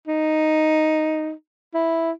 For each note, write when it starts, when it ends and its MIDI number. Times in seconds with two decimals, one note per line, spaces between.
0.07 1.31 63
1.74 2.11 64